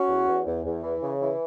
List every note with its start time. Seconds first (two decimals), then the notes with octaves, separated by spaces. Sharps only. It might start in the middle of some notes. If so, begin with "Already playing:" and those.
Already playing: C#4 F#4
0.08 E2
0.27 E2
0.47 E2
0.65 E2
0.83 E3
1.03 C#3
1.21 E3